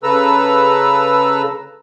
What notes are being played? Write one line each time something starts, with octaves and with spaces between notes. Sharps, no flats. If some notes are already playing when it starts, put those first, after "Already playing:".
C#3 A4 B4 A#5 E6